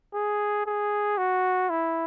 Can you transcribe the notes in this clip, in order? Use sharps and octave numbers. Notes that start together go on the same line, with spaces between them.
G#4
G#4
F#4
E4